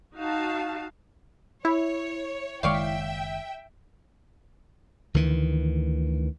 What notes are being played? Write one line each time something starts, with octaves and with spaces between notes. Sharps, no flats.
D#4 F#4 F5 A5
E4 C#5
F#1 D#3 G#3 C#5 D5 E5 F5 G5
D2 D#3 E3